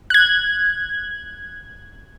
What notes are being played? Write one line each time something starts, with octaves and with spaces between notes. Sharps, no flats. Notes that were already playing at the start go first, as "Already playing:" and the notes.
F#6 G#6